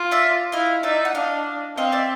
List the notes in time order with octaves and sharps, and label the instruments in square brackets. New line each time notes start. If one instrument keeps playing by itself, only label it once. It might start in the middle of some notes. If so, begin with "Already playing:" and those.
Already playing: [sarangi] F4
[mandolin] D5 E5
[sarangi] E4 [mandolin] D#5 F5
[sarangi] D#4 [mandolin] D5 E5
[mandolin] F#5
[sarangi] D4 [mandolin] D#5 F5
[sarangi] C4 [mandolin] D#5 F5
[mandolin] D5 E5